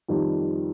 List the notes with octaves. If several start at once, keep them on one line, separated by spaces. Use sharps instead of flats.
F2 D#3 G3